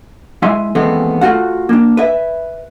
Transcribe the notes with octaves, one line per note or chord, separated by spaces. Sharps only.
G#3 E4 E5 G#5 C6
D#2 E3 G#3 A3 B3 C4
A3 F4 F#4 F#5
A#3 D4
B4 E5